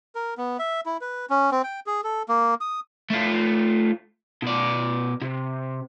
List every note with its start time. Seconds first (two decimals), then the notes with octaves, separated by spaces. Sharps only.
0.15 A#4
0.38 B3
0.59 E5
0.86 E4
1.01 B4
1.30 C#4
1.52 C4
1.64 G5
1.87 G#4
2.04 A4
2.29 A#3
2.61 D#6
3.10 A3 F4
4.42 B2 D5
5.21 C3